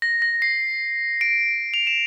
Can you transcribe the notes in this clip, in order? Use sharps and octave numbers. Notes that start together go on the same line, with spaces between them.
A#6
A#6
C7
D7
F7
E7